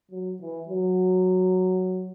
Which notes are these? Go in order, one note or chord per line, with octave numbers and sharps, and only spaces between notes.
F#3
E3
F#3